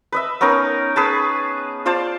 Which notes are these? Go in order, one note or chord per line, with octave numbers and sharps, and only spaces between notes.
B4 D#5 E5
B3 C#4 D#4 A#4
G#4 B4 A5
F4 C5 D5 A5